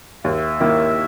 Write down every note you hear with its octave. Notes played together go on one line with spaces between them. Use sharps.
D#2 E5
D#3 A#3 E4